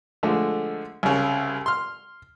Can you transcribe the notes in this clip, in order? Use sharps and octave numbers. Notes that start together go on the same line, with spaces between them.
D3 F3 G#3 A3
C2 C#3
C6 F6